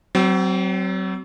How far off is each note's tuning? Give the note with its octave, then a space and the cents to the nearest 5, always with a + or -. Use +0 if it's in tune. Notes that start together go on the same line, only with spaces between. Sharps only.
F#3 +30 C4 -10